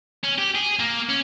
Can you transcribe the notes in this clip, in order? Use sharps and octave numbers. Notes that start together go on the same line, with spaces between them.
C#4
G4
G#4
A#3
C#4